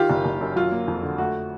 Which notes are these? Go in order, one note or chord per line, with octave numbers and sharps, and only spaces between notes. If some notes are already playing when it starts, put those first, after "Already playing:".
Already playing: D#3 F4 G4
F#1
F#1
F#2
F#3 F4
A#3
F2
D3
A3 F#4